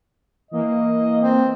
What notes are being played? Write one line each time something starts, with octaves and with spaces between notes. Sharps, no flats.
E3 A#3 D#5
C4